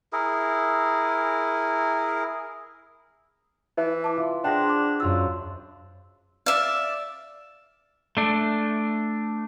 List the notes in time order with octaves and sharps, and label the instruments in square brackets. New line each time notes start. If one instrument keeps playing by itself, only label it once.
[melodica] E4 G#4 A#4
[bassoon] E3 [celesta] E4
[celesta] A5 D6
[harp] F4
[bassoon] D4 [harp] G#4 C5 F#5 [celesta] G5 A#6
[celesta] D6
[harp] F#2 F4 A6 [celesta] C6 E6
[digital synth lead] D5 [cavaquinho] E5 F5
[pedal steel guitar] A3 D4